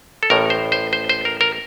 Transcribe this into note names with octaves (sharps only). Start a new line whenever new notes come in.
A4
A1 A2 A#4
C5
C5
C5
C5
A#4
A#4